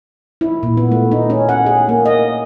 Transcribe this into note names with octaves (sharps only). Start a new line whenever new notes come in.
E4
A#2
B3
A3
D#4
C#4
F#5
G#4
A#3
D#5